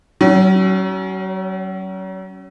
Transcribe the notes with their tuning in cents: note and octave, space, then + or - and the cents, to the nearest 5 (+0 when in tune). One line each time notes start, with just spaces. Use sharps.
F#3 +35 C#4 +0